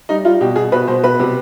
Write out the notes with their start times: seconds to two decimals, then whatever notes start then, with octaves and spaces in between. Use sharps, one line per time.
0.09 G3 D#4
0.25 G3 F4
0.41 B2 G4
0.56 B2 G#4
0.72 B2 B4
0.88 B2 C5
1.03 B2 B4
1.19 C3